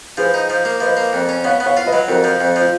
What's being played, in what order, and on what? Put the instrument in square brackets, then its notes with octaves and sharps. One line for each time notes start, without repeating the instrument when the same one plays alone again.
[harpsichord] F3 [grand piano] G#4 B4
[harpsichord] D#4
F3
A#3
[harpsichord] F3 [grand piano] B4 D#5
[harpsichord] A#3
F2
C#4
[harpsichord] B3 [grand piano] C#5 F5
[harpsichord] B3
[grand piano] C#5 F5
[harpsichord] F4
[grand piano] B4 D#5
[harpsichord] F#3
[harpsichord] F2 [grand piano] F#4 A#4
[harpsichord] F3
F2
[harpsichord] F3 [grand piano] F4